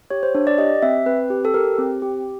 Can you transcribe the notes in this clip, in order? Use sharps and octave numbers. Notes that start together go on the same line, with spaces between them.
G4 C#5
C5
D4 C#5
D5
G4 D#5
C4 E5
C4 B4
G4
A4
G4 A#4
C4
G4